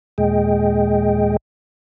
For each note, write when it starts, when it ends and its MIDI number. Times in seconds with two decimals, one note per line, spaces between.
0.18 1.37 39
0.18 1.37 46
0.18 1.37 56
0.18 1.37 68
0.18 1.37 75
0.18 1.37 79